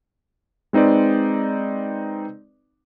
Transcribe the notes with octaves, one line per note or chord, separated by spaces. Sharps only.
G#3 C4 D#4 B4 D5